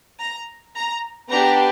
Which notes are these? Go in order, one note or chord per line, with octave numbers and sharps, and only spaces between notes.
A#5
A#5
B3 D4 G4 A#5